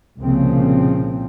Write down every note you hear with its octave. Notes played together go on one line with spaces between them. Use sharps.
C2 A#2 C#3 F3 C4